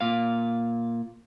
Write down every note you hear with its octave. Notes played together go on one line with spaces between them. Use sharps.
A#2 F5